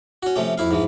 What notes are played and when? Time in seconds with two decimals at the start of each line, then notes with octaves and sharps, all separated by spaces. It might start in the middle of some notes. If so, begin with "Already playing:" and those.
0.23 C#4 F#4
0.36 C3 F3 A3 C#4
0.58 F2 E4 F5
0.71 G#2 E3 F3